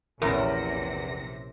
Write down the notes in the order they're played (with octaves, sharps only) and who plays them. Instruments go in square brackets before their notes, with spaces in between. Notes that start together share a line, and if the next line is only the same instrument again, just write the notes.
[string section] A#1 C3 A#6 [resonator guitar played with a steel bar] E2 [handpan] C#4 A#4